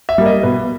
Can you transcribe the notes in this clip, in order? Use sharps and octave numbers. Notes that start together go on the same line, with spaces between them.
E5
G3 A#3
D#5
B2 B4